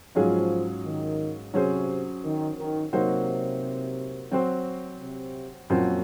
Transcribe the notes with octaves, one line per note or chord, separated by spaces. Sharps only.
G#2 F3 F#3 C#4 F4 G#4
D#3
C3 F#3 C#4 G#4 C5
D#3
D#3
C3 F#3 A#3 D#4 F#4 C5
F#3 C4 F#4 C5
C3
F#2 A#2 F3 C4 F#4 C5